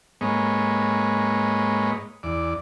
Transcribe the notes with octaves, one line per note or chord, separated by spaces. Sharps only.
G#2 G#3 A#3 B4 C#5 D#5
E2 D5